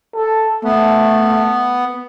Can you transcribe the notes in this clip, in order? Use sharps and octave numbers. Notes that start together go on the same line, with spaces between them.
A4
A3 B3